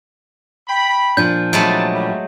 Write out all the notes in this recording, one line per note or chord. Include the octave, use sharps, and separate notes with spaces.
G5 B5
A#2 F3 D4 G6
C3 F#3 G#3 A3 E4 A5
A2 G3